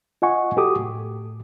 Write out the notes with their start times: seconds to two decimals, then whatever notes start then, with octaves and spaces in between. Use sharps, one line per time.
0.22 F4 D#5 F#5 G#5 C#6
0.57 F#4 G4 A4 D6 D#6
0.79 A2